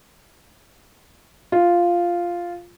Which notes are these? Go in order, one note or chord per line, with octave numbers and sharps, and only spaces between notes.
F4